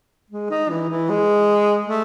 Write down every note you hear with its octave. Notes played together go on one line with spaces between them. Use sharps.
G#3
D#4
E3
E3
G#3
A3